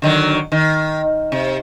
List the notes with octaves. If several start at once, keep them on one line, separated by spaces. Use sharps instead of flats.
D3 D#3 F#3
D#3
C3